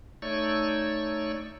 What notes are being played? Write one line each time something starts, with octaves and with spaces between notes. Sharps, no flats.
A3 D#4 C#5 D5 C#6 E6